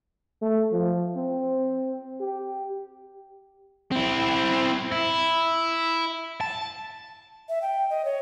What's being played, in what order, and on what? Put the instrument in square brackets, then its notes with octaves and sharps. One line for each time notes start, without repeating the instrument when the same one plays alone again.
[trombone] A3
F3
C4
G4
[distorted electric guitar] C4 E4
E4
A5
[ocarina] E5
G5
D#5
C#5